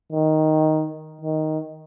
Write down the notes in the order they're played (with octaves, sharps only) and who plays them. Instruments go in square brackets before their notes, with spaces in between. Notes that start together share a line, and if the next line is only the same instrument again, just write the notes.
[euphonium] D#3
D#3